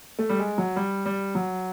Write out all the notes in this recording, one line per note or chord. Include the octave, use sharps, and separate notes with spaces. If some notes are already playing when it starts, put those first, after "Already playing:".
A3
G3
G#3
F#3
G3
G3
F#3